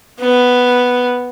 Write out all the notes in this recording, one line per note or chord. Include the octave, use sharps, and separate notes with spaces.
B3